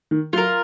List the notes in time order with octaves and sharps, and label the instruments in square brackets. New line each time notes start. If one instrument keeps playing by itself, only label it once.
[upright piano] D#3
[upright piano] F#3 [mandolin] F4
[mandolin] A#4